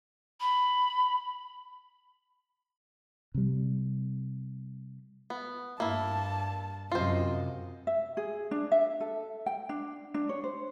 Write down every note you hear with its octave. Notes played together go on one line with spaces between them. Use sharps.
B5
C3 G3
B3
G2 A#3 E4 A5
F#2 C3 F4 C5 D#5
E5
G#4
D4
E5
A4
G5
D4
D4
C#5
C5